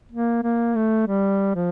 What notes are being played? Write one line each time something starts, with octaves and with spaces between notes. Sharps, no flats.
A#3
A#3
A3
G3
F3